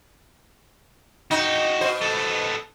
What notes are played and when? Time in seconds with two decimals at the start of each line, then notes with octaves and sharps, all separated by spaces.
1.31 D#4 F#4 G5
1.81 B2 C5
2.01 B3 A4